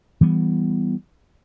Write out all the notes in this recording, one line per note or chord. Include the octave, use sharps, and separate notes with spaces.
E3 G3 B3